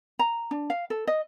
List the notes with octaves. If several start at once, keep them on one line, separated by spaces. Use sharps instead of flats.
A#5
D4
F5
A4
D#5